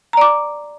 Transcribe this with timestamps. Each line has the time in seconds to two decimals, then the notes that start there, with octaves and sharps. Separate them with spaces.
0.13 A#5
0.17 D5
0.21 D6